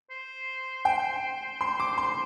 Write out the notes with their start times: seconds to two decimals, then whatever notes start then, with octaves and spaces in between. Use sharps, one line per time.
0.10 C5
0.85 G5
1.61 C6
1.80 D6
1.98 C6